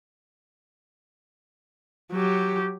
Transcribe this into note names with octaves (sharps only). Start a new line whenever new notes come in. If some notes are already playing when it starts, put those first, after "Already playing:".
F#3 G4